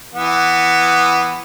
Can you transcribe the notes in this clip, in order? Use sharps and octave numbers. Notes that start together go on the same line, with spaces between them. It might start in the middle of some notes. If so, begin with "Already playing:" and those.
E3 B3